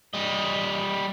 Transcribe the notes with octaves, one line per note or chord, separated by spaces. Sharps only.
G3 D#5